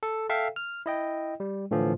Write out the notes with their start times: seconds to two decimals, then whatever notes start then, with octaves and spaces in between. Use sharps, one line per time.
0.03 A4
0.29 A4 E5 F5 G5
0.56 F6
0.86 E4 D#5 G5
1.40 G3
1.71 A2 D3 E3 F3